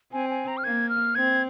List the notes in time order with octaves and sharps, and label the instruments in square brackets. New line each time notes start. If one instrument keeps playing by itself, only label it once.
[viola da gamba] C4 [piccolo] G#5
[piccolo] G#5
A#5
F6
[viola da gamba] A#3 [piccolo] G#6
[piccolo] F6
[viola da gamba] C4 [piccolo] G#6